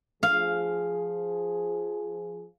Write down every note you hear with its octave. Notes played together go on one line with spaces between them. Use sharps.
F3 G#4 F5